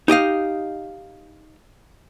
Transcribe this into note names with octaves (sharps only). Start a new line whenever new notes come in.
D#4 G4 D#5 F5